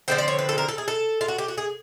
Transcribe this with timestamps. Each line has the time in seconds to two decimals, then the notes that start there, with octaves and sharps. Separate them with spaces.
0.08 D3 F3 G#3 C4 G5
0.18 D5
0.28 C#5
0.39 B4
0.49 A4
0.58 A#4
0.68 A4
0.78 G#4
0.88 A4
1.21 F4
1.28 F#4
1.38 G4
1.48 F#4
1.58 G#4